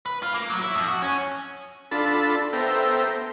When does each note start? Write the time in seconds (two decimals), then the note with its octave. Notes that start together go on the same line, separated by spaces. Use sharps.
0.06 B4
0.23 F4
0.34 A#3
0.50 F#3
0.62 E4
0.75 F2
0.88 F#4
1.02 C#4
1.91 D4 F4 A4 A5 B5
2.53 B3 A4 C5 E5 G5 A#5